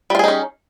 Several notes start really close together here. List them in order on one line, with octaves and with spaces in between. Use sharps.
G3 F4 G#4 D#4 C#4